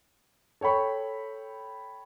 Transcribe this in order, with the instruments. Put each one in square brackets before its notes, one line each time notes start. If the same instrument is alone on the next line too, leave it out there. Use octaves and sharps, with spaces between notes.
[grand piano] A4 C#5 G5 B5 C#6